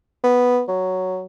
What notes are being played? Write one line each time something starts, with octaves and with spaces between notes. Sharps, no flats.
B3
F#3